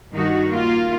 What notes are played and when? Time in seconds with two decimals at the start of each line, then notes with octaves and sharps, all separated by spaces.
0.14 G2 D#3 D#4 F#4
0.53 A#3 F4